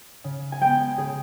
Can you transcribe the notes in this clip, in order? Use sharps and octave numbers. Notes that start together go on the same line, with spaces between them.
C#3
G#5
G#3 B3 G5
C#3 G#4